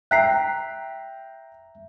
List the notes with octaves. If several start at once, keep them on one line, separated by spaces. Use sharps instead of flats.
E5 G5 A#5 F#6 B6 C7